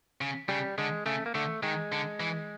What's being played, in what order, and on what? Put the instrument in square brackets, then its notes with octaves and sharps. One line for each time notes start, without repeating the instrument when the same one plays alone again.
[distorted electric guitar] C#3
[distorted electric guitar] C#3 [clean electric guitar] G3
[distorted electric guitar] D3 [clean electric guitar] G#3
[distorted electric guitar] C#3 [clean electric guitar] A3
[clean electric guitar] A#3
[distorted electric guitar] D3 [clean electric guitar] A3
[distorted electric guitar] D#3 [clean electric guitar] G#3
[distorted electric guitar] D3
E3